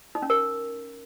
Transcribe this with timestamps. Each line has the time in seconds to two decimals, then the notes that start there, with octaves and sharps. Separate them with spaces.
0.15 D#4
0.22 C#4
0.30 A#4